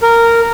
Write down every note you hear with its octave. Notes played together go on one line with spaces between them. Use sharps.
A#4